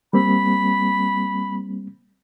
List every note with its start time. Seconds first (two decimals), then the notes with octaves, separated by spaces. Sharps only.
0.13 G3 A#3 C4 B5